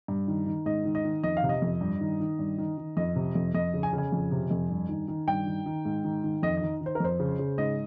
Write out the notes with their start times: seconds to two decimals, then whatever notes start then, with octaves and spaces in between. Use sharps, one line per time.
0.08 G2
0.28 D#3
0.46 D#3
0.66 G#2 D#5
0.85 D#3
0.95 D#5
1.05 D#3
1.23 F2 D#5
1.37 F5
1.43 C3
1.49 D#5
1.62 F2
1.81 G2
2.01 D#3
2.20 D#3
2.39 G2
2.58 D#3
2.78 D#3
2.97 F2 D#5
3.16 C3
3.35 F2
3.54 F2 D#5
3.74 C#3
3.83 G#5
3.93 C#3
3.98 G#5
4.12 F2
4.31 C3
4.51 F2
4.70 G2
4.89 D#3
5.08 D#3
5.27 G2 G5
5.46 D#3
5.66 D#3
5.85 G#2
6.04 D#3
6.24 D#3
6.43 F2 D#5
6.57 D#3 D#5
6.81 D#3 C5
6.95 A#4
7.00 F2 C5
7.20 C#3
7.39 C#3
7.58 G#2 D#5